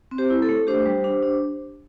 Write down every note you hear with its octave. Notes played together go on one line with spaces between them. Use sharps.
C4
G4 C5
E4
A4
A3
D4 G4 C5
G3
D4
D4